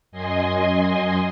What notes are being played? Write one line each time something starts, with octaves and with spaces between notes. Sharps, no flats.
F#2 D#5 G#5 C6